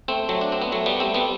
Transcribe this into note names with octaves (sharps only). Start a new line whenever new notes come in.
A3 C4
F#3 A3
D4
C4
B3
F#3 A3
G3 B3
A3 C4
G3 B3